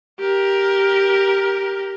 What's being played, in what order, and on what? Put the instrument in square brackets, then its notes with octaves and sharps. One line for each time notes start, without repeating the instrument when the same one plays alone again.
[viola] G4 A#4